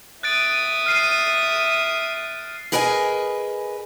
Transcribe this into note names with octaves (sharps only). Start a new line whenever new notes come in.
E5 D#6 F#6 A6 D7
F6 C7 D#7
G#4 A#4 B4 D#5 F#5 G#5